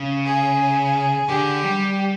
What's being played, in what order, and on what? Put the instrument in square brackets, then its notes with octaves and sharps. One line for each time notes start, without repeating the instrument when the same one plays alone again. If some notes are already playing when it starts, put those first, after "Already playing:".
Already playing: [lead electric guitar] C#3
[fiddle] G#4
[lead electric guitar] D3 [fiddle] G4
[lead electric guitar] G3